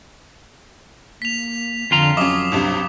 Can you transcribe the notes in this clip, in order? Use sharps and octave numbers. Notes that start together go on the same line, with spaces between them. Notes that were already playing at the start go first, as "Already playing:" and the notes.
A#3 B6 F7
F2 D3 F4 A#5
F#3 C#4 D#5 D6 D#6
C#2 G2 C3